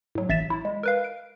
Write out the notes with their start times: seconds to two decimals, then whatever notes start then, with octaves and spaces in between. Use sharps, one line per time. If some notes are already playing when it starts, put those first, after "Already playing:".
0.15 A2 F#3
0.29 A1 E5 A6 B6 E7
0.50 E4
0.65 G#3
0.83 A#4 B4 F5
1.04 D7